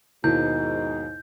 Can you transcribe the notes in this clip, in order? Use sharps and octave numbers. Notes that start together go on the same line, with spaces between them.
D#2 G#2 B2 A#3 D#4 E4 G6